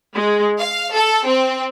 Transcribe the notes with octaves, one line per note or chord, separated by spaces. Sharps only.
G#3
F5
A4
C4